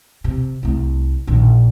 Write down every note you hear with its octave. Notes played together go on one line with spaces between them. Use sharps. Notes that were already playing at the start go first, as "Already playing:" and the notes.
C3
C2 A3
A#1 D#3